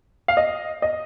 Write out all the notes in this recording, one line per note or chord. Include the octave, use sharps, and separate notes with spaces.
F5
D#5
D#5